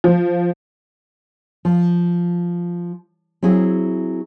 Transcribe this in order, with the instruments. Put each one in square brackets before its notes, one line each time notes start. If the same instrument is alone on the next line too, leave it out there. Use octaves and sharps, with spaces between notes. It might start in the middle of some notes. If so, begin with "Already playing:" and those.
[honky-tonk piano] F3
[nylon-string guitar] F3
F#3 C4 E4 G#4